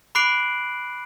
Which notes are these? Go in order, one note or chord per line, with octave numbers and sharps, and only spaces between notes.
B5 D6 F#6 C7 D7 F#7